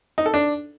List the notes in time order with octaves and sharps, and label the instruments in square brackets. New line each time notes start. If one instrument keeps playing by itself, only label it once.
[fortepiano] D#4
A4
D4